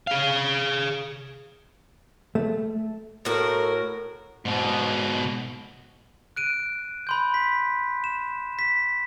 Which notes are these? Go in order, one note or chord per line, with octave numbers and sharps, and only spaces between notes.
G#4 F5
A3
A2 F#4 A4 A#4
G#2 B2
F#6 D7 D#7
B5 C6 G6
B6
E7
B6